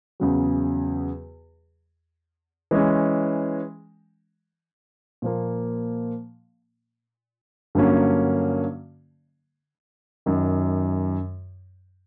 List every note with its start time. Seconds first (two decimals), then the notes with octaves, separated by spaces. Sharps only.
0.20 E2 C#3 F#3
2.71 E3 G#3 C#4
5.22 A#2 F3 A#3
7.75 G2 D3 F#3 A#3 C#4
10.26 F#2 D#3 F#3